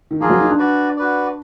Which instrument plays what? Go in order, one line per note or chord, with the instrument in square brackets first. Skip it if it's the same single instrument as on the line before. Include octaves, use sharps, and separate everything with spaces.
[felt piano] D#3
[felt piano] F3 [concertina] A#3 F4 G#4
[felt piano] F#3
D#4
D4
[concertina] F#4 B4 D5
F#4 B4 D5